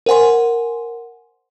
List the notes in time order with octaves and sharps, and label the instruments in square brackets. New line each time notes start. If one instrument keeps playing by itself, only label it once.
[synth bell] A#4 C5 F#5 G#5 C6